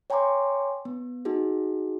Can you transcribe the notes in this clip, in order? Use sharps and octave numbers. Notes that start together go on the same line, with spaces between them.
C#5 G5 G#5 A#5 C6 D6
B3
D#4 F#4 G#4